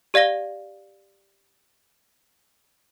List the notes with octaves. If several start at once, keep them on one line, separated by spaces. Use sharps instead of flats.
G4 D5 F5 A#6 G7